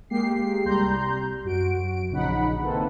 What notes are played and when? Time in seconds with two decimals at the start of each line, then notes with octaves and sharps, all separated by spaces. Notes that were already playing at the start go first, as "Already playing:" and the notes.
0.10 G#3 A#3 G4 C7
0.65 C2 G3 A#5 C6 G6
1.45 F#2 F#4 D7
2.10 A#1 C#3 D#4 F#5 B5
2.61 D#3 E3 A#3 C4 A4 B4